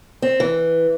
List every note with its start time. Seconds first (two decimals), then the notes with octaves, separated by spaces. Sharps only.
0.22 C4
0.40 E3